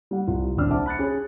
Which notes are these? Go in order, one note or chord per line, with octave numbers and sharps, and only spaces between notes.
G3 F#5
C2 F4
D#1 C2 C4 D4 E6 F6
C5 E5 F#5 A5 D6
B5 F#6 A6 C#7
C#4 G#4